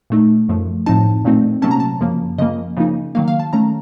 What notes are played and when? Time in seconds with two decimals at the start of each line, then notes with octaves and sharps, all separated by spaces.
0.10 A#2 A3 D#4
0.49 F#2 F3 A3
0.86 A2 F3 C4 D#4 A5
1.25 A#2 A3 C4 D#4
1.62 C3 F#3 A#3 C#4 A5
1.71 A#5
1.80 A5
2.01 F#2 C#3 F3 A#3
2.38 C#3 F3 A#3 D#5
2.77 C#3 F3 A#3 D#4
3.15 D#3 F#3 A#3 F5
3.28 F5
3.40 A5
3.53 D#3 A3 C#4 A#5